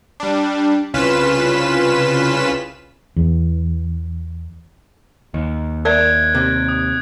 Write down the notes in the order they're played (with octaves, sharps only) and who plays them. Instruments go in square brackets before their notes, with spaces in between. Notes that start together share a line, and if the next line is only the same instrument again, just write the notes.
[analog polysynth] G3 D4
C2 C#3 F4 B4 B6 E7
[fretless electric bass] E2
[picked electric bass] D#2
[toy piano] A#4 D5 E5 [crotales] F#6 G#6 D7
[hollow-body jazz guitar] C3
[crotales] D#6